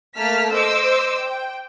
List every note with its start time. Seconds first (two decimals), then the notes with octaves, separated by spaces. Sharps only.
0.16 A3 A#3 A5 F6 B6
0.53 C5 D#5 D6 E6
1.18 G5